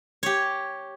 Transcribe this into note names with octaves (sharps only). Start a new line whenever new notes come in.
G4 C#5